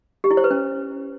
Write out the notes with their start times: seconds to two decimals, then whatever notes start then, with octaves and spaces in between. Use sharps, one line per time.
0.24 G4
0.31 E4
0.37 C5
0.44 B4
0.51 C#4